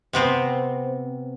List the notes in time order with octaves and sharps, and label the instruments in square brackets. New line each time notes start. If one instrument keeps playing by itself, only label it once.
[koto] C3 B3 C4